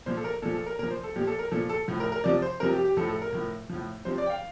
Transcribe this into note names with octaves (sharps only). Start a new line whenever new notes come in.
A#2 F3 C5
A4
A#4
A#2 F3 A4
A4
A#4
A#2 F3 A#4
C5
A4
A#2 F3 G4
A4
A#4
A#2 F3 A4
A4
A2 F3
A#4
A#4
C3 F3 D5
C5
C3 F3 A#4
G4
G4
A2 F3 A4
A4
A#4
A2 F3
A2 F3
C3 F3 C5
D5
G5
F5